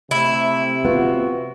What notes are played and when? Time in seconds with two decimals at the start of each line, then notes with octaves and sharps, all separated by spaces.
0.11 C3 A3 E4
0.85 B3 F4 F#4